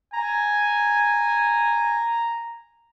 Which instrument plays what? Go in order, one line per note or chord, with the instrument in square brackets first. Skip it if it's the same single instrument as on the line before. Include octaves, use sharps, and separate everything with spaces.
[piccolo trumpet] G#5 [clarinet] A#5